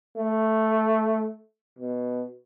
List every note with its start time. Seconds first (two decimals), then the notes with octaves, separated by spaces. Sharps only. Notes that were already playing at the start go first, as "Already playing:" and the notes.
0.17 A3
1.79 B2